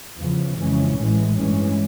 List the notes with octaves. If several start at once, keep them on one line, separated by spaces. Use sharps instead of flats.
E2 C#3 F3
F2 C#3 E3 G#3 C#4
A1 A2 E3 G#3
G2 E3 G#3 C#4